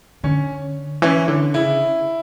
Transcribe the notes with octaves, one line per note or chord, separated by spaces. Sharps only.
D3 C#4
E3 C#4
D3
C#3 E4